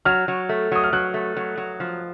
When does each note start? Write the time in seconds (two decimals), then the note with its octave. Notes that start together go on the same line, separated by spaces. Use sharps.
0.05 F#3 F6
0.28 F#3
0.49 A3
0.72 F#3 D#6
0.84 F6
0.93 F#3 F#6
1.14 A3
1.37 F#3
1.57 F#3
1.80 F3